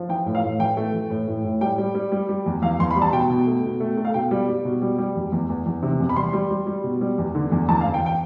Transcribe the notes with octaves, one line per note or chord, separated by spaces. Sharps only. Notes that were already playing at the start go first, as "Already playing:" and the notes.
Already playing: F3
E3 G5
A2
F5
A2
E3 G5
A3
E3
A2
A2
A2
G3 G5
G3
G3
G3
G3
E2
E2 F5
E2 C6
B5
G3
A5
B2 G5
B2
A3
B2
A3
A3
F5
B2 G5
G3
G3
B2
G3
G3
E2
E2
E2
E2
C3
E2
B5
G3 C6
G3
G3
G3
B2
G3
E2
D3
E2
E2 A5
E2 F5
G5
G5